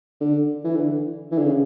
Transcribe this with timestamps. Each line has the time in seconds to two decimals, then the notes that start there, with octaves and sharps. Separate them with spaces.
0.21 D3
0.64 E3
0.76 D3
1.31 E3
1.38 D3
1.45 C#3